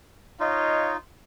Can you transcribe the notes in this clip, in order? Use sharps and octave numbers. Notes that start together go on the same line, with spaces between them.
D#4 F4 C#5 D#5 F5